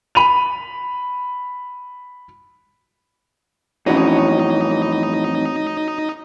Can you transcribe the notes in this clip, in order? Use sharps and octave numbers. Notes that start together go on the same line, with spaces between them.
B5 D#7 F7
F2 A2 E3 C#4 D#4 F#4 C#5 D#5